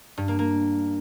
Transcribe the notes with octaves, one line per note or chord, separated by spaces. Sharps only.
G2
A#3
A#3